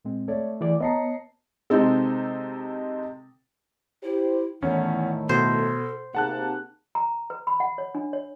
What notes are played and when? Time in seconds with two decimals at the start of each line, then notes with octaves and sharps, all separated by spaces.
0.05 A#2 G#3 C4
0.28 A3 C#5 D5 E5
0.61 E3 G#4 D5
0.80 B3 C#5 D#5 A5 A#5 C7 C#7
1.70 C3 G#3 C4 D#4 A4
4.03 E4 G4 C5
4.62 E2 A2 D#3 A3 C#4 F#5
5.29 B2 A4 C5
6.15 C3 A#3 D#4 G#4 F#5 A5 F#6
6.95 A#5
7.30 B4
7.47 B5
7.60 F#5
7.78 C#5
7.95 D4
8.13 C#5